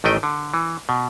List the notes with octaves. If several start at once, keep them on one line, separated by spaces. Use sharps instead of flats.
A1 D#3 A3 D#5 G5
D3
E3
B2